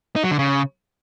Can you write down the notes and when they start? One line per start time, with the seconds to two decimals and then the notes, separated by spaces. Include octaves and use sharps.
0.16 D#4
0.24 F#3
0.31 D3
0.39 C#3